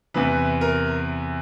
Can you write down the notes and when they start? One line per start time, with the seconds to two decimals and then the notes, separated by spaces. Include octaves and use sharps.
0.14 E2 C3 E3 B4
0.61 A#4